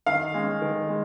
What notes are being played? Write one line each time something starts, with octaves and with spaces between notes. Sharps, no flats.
D#3 F5
G#3 C#4
D#3
G#3